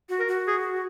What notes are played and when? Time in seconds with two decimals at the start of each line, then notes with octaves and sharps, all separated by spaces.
0.09 F#4
0.19 A#4
0.28 F#4
0.47 G#4